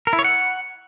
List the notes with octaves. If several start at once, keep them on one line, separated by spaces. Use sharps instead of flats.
A#4
E4
C#5
F#5